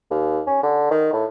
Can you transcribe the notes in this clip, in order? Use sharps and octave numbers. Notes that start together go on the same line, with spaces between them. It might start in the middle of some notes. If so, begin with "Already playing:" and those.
D#2
C#4
D3
D#3
A2